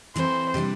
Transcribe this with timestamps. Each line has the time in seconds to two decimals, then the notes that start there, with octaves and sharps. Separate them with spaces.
0.16 E3 C4 E4 A4 C5
0.54 C3 E3 G3 D4